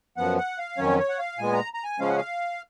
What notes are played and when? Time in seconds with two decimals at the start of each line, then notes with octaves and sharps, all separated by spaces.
0.17 F#2 F3 B3 F#5
0.38 F#5
0.59 F5
0.78 F2 D#3 F#3 C#4 C#5
0.99 C#5
1.09 F#5
1.19 F5
1.38 A#2 G#3 B3 G#5
1.53 A#5
1.74 A#5
1.84 G#5
1.99 C#3 F3 G#3 C#4 F5
2.08 F#5
2.17 F5